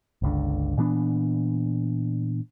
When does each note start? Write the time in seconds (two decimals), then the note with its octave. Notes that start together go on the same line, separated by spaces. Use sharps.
0.22 G1 C#2 D3
0.77 A#2 E3 B3 D4